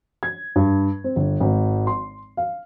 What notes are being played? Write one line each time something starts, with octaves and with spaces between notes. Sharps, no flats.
G#6
G2
C4
G1
G#1
C6
F5